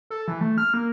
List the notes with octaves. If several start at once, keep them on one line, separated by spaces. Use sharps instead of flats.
A4
E3
A3
F6
A#3